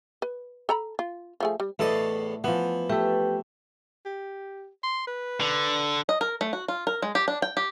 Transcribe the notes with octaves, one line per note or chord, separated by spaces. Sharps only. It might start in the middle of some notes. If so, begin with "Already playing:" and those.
B4
A4 A#5 B5
F4
F3 A3 G#4
G3
E2 A2 A3 D5 D#5 A5
E3 F3 B3
A3 G4 A4 B4 G5
G4
C6
B4
D3
D#5
A#4
A3
F#4
F4
A#4
G#3
G4
D4
G5
G4